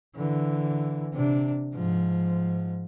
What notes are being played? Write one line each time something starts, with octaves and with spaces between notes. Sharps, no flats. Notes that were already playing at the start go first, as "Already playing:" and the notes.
D3 E3
C3 D4
G#2 F3